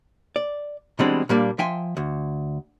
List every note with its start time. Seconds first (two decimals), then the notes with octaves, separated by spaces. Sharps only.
0.36 D5
0.99 B2 E3 G3 G#3 C4 D4
1.29 A#2 G3 A#3 D4
1.59 F3 E5 G5 G#5 C6
1.97 D2